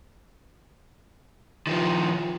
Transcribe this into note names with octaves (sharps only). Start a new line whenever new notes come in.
D#3 F3